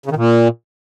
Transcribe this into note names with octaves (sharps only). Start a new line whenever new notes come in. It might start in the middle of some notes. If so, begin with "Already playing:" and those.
C#3
D#3
A#2